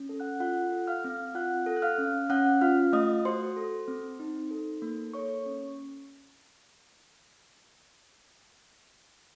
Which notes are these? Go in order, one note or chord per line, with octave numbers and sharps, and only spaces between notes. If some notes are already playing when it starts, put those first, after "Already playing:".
Already playing: C#4
A4
F#5 F#6
F4 F#5 F#6
A4
F5 F6
C4
F4 F#5 F#6
A4
F#6
F5 F6
C#4
C#4 F#5 F#6
F4 F5 F6
A3 D#5 D#6
F#4 C5 C6
A4
C4
D#4
A4
A#3
A4 C#5 C#6
C#4